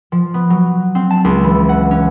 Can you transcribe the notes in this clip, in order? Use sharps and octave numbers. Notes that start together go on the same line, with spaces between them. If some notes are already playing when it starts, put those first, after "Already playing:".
F3
B3
F#3
C4
A5
C#2
E3
F#5
C#4